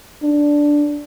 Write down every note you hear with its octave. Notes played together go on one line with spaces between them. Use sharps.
D4